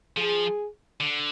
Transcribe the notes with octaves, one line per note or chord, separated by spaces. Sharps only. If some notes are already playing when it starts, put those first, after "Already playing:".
F3 G#4
D3